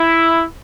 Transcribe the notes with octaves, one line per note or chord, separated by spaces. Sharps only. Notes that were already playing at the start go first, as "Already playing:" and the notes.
Already playing: E4